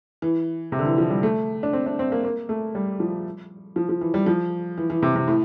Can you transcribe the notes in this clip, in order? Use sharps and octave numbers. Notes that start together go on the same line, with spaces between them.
E3
C3
D3
E3
F3
G3
A3
D4
C4
D4
C4
A#3
A#3
A3
G3
F3
F3
F3
E3
G3
F3
E3
E3
C3
C3
A2